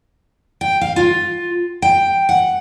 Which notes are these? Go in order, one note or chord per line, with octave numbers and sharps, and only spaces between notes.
G5
F5
F4
G5
F#5